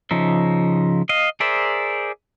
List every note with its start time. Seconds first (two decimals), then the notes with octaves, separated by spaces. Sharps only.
0.11 C#3 F3 D#4 E5
1.09 D#5 F5
1.40 G#4 A#4 C5 D5 E5